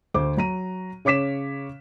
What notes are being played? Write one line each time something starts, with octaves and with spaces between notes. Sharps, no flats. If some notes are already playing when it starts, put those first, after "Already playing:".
D2 C5 D6
F#3 A#5 D#7
C#3 C#5 D6 B6 E7